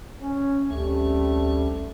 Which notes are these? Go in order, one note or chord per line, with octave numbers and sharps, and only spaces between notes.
C#4
A1 D2 C3 G3 A3 C#4